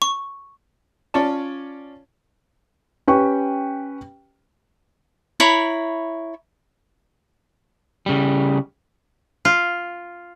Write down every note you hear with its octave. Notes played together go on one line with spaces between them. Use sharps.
C#6
C#4 F4 C#5 D5 A5
C#4 G4 B4 G5 C#6
E4 C#5 A#5 B5
C#3 G3
F4